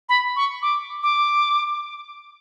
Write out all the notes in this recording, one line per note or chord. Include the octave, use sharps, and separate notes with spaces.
B5
C#6
D6
D6